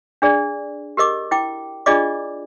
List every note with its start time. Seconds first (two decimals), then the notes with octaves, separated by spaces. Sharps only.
0.22 D4 G#4 D5
0.97 G4 A#4 D#5 D6
1.31 E4 G5 D6
1.86 D4 F4 G#4 D5 D#5 D6